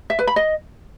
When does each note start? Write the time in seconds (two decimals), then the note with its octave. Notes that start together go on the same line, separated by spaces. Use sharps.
0.10 E5
0.19 B4
0.27 B5
0.36 D#5